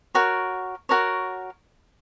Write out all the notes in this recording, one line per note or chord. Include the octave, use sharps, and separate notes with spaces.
F#4 A#4 C#5
F#4 A#4 C#5